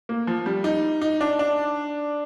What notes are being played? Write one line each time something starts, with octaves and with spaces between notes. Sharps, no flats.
A#3
F3
G3
D#4
D#4
D4
D4